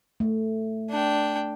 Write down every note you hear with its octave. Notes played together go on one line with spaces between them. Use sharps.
A3
D4 G5